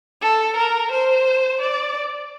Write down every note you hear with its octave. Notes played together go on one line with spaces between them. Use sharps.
A4
A#4
C5
D5